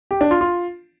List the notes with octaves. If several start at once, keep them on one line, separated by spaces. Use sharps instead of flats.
G4
D4
F4
F4